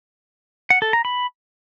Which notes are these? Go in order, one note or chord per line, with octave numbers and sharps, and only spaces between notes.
F#5
A4
A#5
B5